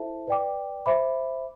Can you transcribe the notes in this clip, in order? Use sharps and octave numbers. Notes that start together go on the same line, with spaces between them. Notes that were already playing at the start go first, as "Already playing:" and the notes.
Already playing: E4 A4 C5 E5 A5
B4 D5 G5 D6
C5 E5 B5 D6